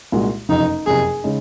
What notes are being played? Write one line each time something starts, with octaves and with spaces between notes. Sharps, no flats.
C2 A#2 G#3 D#4 F#4
F#1 F2 C3 D#4
F#1 F2 C3 G#4
C#3 G#3 D#4